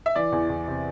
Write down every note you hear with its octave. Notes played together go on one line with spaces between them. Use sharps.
E5
E3 D5
E2
E2
C3